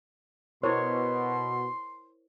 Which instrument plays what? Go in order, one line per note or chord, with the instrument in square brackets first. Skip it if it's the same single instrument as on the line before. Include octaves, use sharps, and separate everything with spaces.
[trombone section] B2 [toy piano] E4 A#4 C5 [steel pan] C#5 [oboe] C6